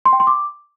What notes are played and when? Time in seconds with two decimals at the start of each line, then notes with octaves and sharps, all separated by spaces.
0.06 C6
0.13 G5
0.20 C6
0.27 D6